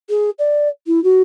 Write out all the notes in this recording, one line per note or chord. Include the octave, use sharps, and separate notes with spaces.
G#4
D5
E4
F#4